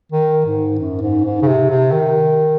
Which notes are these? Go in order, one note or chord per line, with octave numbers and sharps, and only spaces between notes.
D#3
G#2
F#2
G#2
G#2
C#3
C3
C3
D#3